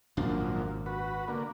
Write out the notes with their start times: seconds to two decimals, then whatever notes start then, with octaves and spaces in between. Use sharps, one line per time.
0.17 G#1 F#2 A#2 F3 D4
0.86 F#4 B4
1.28 D3 A#3